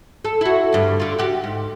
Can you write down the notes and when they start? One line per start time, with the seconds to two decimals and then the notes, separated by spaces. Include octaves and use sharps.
0.25 A4
0.41 E4 F#4
0.72 D2 G2
1.00 D3 F4
1.19 F#4 G4
1.44 G#2